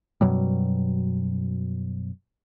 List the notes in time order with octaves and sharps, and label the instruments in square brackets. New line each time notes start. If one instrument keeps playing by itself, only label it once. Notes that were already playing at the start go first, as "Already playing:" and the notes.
[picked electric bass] F#2 B2 F#3 G3